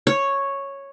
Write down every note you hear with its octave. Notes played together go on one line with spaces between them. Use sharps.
C#5